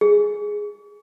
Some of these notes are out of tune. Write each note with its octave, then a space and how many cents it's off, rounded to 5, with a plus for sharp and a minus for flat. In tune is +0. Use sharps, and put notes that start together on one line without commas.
G#4 +0